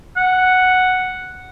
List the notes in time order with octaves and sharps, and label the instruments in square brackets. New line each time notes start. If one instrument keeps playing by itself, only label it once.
[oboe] F#5